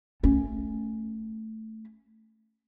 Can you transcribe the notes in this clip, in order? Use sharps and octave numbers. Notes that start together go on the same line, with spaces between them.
A3 C#4